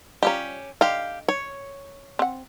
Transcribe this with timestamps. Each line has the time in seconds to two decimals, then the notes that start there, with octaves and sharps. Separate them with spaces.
0.23 G3 C#4 F4 G4 A#5
0.81 D3 D#4 G4 F5
1.28 C#5
2.19 C4 F#5